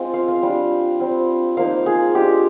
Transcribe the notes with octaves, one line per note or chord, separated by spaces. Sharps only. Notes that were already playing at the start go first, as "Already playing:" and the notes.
Already playing: G#3 C4 F4
F5
F5
G3 D4 F4
G3 C4 F4
F3 A#3 D#4 F5
G#4
G#3 D4 F4 G4